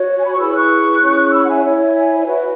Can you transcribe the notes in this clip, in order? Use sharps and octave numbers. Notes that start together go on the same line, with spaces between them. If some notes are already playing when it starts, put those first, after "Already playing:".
Already playing: F#4 C#5
G#5
B5
C#6
E4 G#4 B4 B5 E6
C#6 F#6
C#4 E4 G#4 C#5
B5 E6
F#5
E5 G#5
E4 C#5 E5
E5
E5 G#5
C#5
F#4 B4 E5